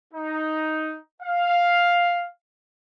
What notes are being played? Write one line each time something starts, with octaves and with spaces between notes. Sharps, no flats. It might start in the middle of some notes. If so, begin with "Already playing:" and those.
D#4
F5